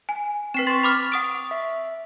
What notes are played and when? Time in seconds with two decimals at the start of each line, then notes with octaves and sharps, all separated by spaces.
0.09 G#5
0.54 C4 B4 B6 C7 E7
0.67 C6 C#6 A6
0.83 B5 D6 F6
1.12 F#5 D#6 D7
1.51 E5